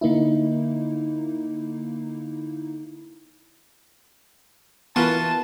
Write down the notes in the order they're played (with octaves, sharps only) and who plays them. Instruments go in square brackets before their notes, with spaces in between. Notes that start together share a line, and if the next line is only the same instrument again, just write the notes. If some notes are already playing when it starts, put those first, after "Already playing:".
[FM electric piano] D3 A#3 D#4 E4
[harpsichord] E3 F4 F#4 [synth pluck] B3 A#4 B4 [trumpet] A5